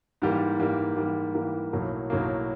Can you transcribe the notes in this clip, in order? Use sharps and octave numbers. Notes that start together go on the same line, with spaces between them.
G#2 E3 G3 A#3
G#2 E3 G3 A#3
G#2 E3 G3 A#3
G#2 E3 G3 A#3
B1 A2 F#3 A#3
B1 A2 F#3 A#3